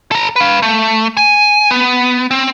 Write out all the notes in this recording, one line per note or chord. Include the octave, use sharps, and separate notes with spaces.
A4 A#5
B4 F5
A3
G#5
B3
C4